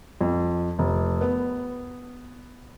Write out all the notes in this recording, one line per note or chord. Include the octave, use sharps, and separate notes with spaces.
F2
F1
B3